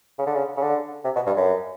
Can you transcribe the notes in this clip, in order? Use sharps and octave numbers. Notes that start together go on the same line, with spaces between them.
C#3
D3
C#3
C#3
D3
C3
B2
G2
F#2